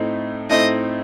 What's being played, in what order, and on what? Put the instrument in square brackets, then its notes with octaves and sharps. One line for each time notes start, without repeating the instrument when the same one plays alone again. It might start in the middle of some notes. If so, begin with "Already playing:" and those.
Already playing: [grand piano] A2 A3 C4 D#4
[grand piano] A2 A3 C4 D#4 [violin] D#5